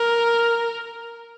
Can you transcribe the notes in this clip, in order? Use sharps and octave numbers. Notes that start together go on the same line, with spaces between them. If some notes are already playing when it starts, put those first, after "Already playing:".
Already playing: A#4